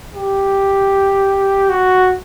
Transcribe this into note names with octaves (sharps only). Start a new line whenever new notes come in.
G4
F#4